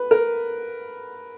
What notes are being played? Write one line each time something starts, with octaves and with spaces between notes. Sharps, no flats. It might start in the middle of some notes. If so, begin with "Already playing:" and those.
Already playing: B4
A#4